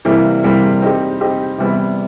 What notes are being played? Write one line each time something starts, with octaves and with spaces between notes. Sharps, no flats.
C3 E3 G3 A#3
C3 E3 G3 A#3
C4 D#4 G4
C4 D#4 G4
C3 E3 G3 B3 E4